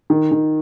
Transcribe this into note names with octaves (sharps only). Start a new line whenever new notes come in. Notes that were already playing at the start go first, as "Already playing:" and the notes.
D#3
D#3